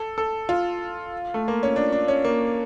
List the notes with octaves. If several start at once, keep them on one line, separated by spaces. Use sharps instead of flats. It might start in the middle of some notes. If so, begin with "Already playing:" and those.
Already playing: A4
A4
F4
A3
A#3
C#4
D4
D4
C#4
A#3